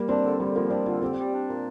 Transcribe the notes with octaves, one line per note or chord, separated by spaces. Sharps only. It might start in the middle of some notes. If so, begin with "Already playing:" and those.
Already playing: G3 A#3
C4 D4
D3
D3 G3
F3 A#3
C4 D4
D3 F4
C4 G4
G3
D4
A#2